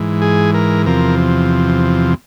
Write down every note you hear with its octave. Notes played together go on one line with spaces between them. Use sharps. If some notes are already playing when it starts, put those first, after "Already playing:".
Already playing: G#2 E3
G#4
A#4
E2 C3 F3 A#4